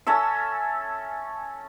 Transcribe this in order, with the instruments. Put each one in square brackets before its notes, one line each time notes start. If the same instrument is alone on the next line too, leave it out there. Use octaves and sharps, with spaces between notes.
[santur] C#4 A4 E5 E6